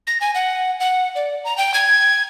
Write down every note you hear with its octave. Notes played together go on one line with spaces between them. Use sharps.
A#6
G#5
F#5
F#5
D5
A#5
G5
G#6